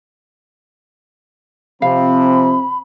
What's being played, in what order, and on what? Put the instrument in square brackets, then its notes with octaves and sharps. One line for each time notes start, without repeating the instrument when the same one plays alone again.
[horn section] C3 F3 [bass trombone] C4 [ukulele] F5 [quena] B5